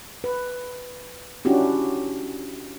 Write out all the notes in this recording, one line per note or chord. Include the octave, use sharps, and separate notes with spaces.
B4
C#4 D4 E4 F#4 G4